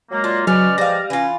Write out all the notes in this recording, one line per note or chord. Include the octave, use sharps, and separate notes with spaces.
F#3 G#3 A#3
D4 F4
C#3 F#3 G#3 C#4 B4 D5 F6
F3 G3 F5 A#6
E3 C#4 F4